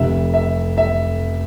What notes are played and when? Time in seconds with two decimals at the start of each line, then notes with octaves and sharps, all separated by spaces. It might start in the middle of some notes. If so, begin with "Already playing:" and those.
Already playing: F1 F2 C3 E5
0.34 E5
0.78 E5